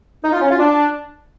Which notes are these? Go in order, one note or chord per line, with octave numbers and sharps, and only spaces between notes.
D#4
F4
C#4
F4
D4